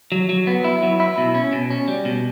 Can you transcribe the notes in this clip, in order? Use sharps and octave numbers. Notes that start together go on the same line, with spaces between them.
F#3
F#3
B3
E4
F#3
E4
B2
C#4
B2
C#4
G3
B2